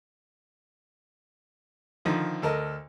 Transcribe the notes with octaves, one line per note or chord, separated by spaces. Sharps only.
D3 D#3 F3
D2 A4 A#4 D#5